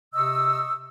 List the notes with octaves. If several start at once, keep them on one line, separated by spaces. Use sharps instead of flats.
C3 D#5 C#6 D#6 E6